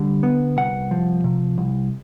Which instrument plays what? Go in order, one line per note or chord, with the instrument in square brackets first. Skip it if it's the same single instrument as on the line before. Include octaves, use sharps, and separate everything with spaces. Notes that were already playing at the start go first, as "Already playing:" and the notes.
Already playing: [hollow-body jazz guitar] D3 G3
B3
C2 F#5
F3
C3
C2